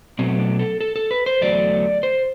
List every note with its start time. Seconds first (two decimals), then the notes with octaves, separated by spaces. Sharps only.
0.19 B2 F#3 A3 C4
0.39 D4
0.59 A4
0.81 A4
0.96 A4
1.11 B4
1.26 C5
1.41 E2 D3 F#3 A3 D5
2.03 C5